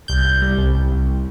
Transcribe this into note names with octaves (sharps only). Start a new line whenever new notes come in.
C2 G6
C2
G3
C2
C2
C2